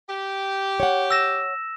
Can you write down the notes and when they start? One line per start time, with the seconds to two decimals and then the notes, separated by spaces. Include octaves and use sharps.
0.09 G4
0.80 C#5 F#5
1.11 E6 A#6 E7